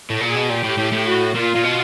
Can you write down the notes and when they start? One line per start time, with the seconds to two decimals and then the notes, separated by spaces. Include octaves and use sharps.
0.10 A2
0.21 A#2 G#4
0.36 B2
0.50 A#2 G4
0.64 A2
0.78 A2
0.92 A2
1.07 F#4
1.35 A#2 F4
1.55 A#2
1.64 B2